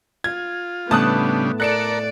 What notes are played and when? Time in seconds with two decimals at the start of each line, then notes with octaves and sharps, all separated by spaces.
0.24 F4 G#6
0.91 A2 C#3 G3 B3 D4 A5 D#6 F#6
1.60 A4 A#4 D5 F#6 C#7 E7